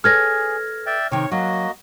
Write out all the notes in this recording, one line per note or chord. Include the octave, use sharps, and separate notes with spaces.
G#4 A4 B4 C#5 F6 G#6 A#6
D5 E5 G5
C3 D#3 C#5
F#3 A#3 F#4 D#5